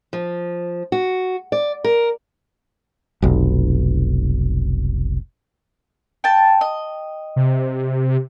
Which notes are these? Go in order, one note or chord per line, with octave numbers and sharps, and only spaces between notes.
F3
F#4
D5
A#4
F1 B1
G5 A5
D#5
C3